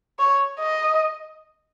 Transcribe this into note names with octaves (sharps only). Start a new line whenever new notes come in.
C#5
D#5